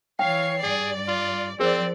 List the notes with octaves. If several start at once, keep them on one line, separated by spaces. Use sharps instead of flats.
E3 C#5 F5 G5 C7
G2 G#4 D5
F4
F3 C4 G#4 A#4 C5 D5